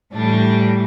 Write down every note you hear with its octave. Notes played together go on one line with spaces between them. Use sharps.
A2 E3 G3 D4